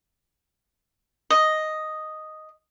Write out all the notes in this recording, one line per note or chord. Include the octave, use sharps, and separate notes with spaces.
D#5